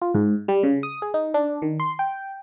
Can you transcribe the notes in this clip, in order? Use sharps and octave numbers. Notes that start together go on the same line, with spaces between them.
F4
G#2
G3
C#3
D#6
G#4
D#4
D4
D#3
C6
G5